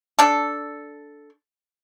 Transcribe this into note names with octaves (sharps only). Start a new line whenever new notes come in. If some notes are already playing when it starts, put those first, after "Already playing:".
D4 A4